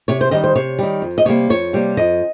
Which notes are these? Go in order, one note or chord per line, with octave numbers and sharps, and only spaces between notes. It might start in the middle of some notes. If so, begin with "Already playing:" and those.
C3 C#5
C5
D#3 G3 D#5
C5
C3 C#5
D#3 G3
F2
D#5
C3 G3 A#3 C#5
F2 C#5
C3 G3 A#3
F2 D#5